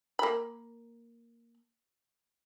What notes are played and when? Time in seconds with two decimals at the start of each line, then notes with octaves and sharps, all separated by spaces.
0.19 A#3 B5